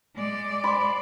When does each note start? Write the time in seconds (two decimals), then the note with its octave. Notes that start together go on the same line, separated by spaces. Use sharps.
0.16 G#3 D5
0.64 B5 C6